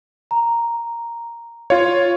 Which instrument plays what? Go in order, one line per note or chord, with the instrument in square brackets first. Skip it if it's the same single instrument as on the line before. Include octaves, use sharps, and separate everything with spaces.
[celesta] A#5
[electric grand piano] F4 C#5 [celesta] F5 C#6